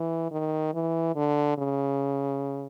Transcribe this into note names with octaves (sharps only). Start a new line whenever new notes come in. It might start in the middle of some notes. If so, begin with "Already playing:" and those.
Already playing: E3
D#3
E3
D3
C#3